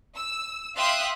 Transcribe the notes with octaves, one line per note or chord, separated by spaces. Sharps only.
E6
E5 F5 G5 C6 D#6 F#6